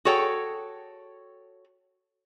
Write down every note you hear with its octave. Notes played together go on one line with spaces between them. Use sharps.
F#4 G#4 A4 C#5 G5